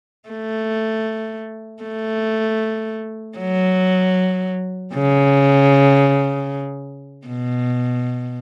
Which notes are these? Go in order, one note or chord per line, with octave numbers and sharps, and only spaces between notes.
A3
A3
F#3
C#3
B2